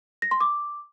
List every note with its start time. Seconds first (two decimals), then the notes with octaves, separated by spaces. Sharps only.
0.22 A#6
0.31 C6
0.41 D6